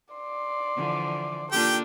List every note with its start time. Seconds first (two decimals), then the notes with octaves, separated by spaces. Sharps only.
0.14 D5 C6
0.76 D3 E3 F3
1.52 A#3 D4 F4 G4 A4 G5